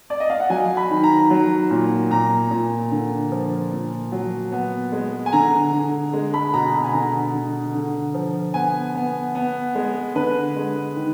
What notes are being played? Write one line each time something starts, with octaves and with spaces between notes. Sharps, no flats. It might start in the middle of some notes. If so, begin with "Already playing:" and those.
D5
D#5
F5
F#5
F#3 G#5
B5
D#3
A#5
F#3
A#2
A#2 A#5
A#2
D3
F3
A#2
F#3
B3
G#3
G#5
D3 A#5
D3
G#3
B5
B2 A#5
B5
G#5
D3 A#5
D3
D3
F3
B3 G#5
B3
B3
G#3
D3 B4
G#3
D#3